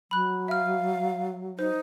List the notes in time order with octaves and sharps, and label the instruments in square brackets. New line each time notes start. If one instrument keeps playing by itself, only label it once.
[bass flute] F#3 [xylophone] B5 F#6
[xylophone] E5 F6 [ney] F5
[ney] D#4 [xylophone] C5